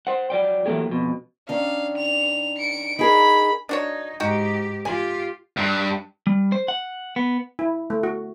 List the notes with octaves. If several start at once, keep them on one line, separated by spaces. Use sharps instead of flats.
C5 F#5
F#3 D5 G5
E3 F#3 A3 A#3 G4 G#4
F2 B2
D#3 C#4 D4 F5
F7
C#7 D7
D#4 G#4 A#4 B5
D4 D#4 F#4 C#5
G#2 D#4 F#4 G4 G5
F4 G4 G#5
G2
G3
C5
F#5
B3
E4
A3
F#4